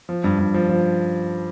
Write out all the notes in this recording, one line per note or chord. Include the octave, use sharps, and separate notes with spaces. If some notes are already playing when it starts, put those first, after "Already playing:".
F3
G2
G2
F3
F3